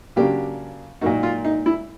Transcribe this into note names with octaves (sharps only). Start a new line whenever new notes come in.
C#3 F#3 A#3 D4 G4
A#2 F#3 A#3 D#4 F#4
F4
D#4
E4